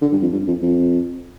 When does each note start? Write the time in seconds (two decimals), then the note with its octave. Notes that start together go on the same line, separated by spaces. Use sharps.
0.01 D3
0.12 G2
0.22 F2
0.32 G2
0.47 F2
0.62 F2